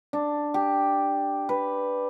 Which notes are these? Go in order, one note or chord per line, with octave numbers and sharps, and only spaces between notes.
D4
G4
B4